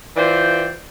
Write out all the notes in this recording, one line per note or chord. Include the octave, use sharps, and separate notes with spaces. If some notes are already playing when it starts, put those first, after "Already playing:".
E3 F4 C5 D5 G5